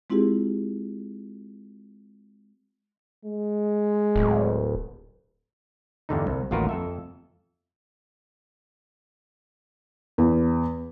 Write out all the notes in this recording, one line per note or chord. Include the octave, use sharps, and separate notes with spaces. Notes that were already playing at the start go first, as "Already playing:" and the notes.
G#3 C4 E4 F4 G4 G#4
G#3
D1
E2 G2 D3 D#4
C2
A1 D#2 F4 F#4 A#4 B4
F2 A4 E5
E2